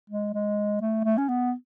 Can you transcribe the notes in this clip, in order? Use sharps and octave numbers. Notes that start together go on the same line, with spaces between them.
G#3
G#3
A3
A3
C#4
B3